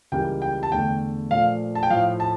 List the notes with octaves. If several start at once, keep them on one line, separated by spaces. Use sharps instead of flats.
C#2 C#3 E3 G3 A#3 G5
G5
A5
E2 D3 A3 G5
A#2 F3 A3 F5
A5
G5
A2 F3 A3 F5
A5